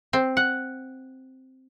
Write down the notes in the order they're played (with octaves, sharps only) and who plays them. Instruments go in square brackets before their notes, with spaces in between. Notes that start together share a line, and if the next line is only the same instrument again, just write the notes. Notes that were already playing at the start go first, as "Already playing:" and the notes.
[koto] C4
F#5